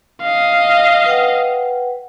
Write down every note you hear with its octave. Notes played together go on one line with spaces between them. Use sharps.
D#5 F5
B4 F#5 G5